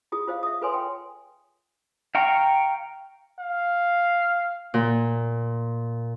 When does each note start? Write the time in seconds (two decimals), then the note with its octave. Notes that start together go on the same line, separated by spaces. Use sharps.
0.12 E4 F4 G#4 D#6
0.27 F4 C5 D#5 F5
0.43 E5 D#6
0.62 F4 A4 B4 C#5 G#5 C6
0.74 G5
2.15 F5 G5 A#5 C#6
3.40 F5
4.74 A#2